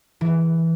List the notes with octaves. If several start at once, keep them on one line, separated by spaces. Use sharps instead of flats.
E3